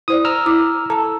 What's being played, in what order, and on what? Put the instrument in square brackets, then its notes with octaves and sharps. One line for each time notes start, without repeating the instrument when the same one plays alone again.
[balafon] E4 C5 D5 [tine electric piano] D#6
[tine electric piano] A#5 E6 F6
[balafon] E4 D6
[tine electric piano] A4 [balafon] A5 A#5